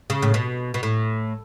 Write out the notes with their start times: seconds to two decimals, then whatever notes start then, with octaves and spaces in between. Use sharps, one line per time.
0.10 C#3
0.22 A2
0.34 B2
0.74 B2
0.83 A2